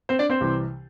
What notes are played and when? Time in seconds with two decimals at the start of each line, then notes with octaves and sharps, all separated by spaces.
0.09 C4 C5
0.19 D4 D5
0.30 C4 C5
0.41 C2 C3 E3